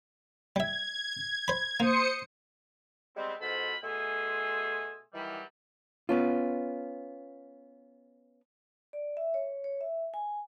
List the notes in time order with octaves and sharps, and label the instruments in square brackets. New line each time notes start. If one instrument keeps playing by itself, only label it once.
[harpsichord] G3 E5 [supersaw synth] G#6
[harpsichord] C5 B5
[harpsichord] A#3 [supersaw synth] C5 D#6 C#7
[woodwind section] G3 G#3 B3 C4
G#2 B2 F4 A4 C5 B5
B2 A3 G#4 G#5 C6 E6
D#3 E3 F#3 G3
[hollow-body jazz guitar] B3 C#4 F4
[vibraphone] D5
E5
C#5
C#5
E5
G#5